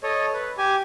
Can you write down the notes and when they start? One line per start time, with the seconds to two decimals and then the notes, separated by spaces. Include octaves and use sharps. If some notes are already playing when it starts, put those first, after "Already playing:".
0.03 A4 C#5 D#5
0.34 B4
0.58 G4 G#5